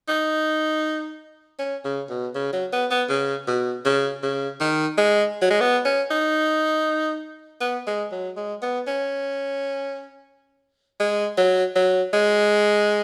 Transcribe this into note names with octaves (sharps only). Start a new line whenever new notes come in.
D#4
C#4
C#3
B2
C#3
F#3
B3
B3
C#3
B2
C#3
C#3
D#3
G#3
F#3
G#3
B3
C#4
D#4
B3
G#3
F#3
G#3
B3
C#4
G#3
F#3
F#3
G#3